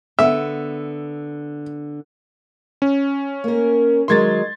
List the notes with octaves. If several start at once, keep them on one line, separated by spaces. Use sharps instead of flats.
D3 B3 E5
C#4
A#3 A#4
D#3 F#3 G#3 C6 G#6 A6